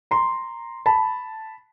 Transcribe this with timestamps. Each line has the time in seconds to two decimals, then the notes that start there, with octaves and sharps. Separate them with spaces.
0.11 A#5 C6
0.86 A5 B5